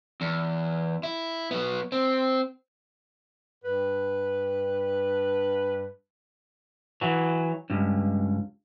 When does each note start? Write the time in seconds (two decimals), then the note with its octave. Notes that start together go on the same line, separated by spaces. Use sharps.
0.21 E2
1.03 E4
1.51 F#3 B3
1.92 C4
3.64 G2 B4
7.01 E3 F#3
7.70 C#2 G2